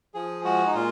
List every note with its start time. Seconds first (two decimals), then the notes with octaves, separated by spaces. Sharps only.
0.14 F3 G#4
0.44 G#3 F#4
0.66 D#4
0.74 A#2 F4